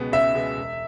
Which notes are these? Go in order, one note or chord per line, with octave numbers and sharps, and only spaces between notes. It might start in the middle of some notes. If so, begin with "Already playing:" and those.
Already playing: C#2 B2 G#3 B3
C#2 E5
B2 G#3 B3
E1